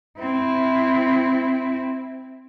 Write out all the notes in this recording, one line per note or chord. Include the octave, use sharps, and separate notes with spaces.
C4 E4